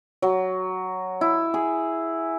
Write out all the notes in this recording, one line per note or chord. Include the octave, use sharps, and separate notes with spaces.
F#3
E4
G#4